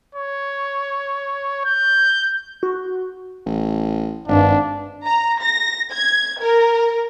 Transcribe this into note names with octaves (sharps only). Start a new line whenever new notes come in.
C#5
G6
F#4
A1
G#1 G2 D4
A#5
A#6
G#6
A#4